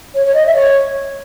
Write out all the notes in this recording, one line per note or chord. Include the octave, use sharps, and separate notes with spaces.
C#5
C#5
D#5
E5
C#5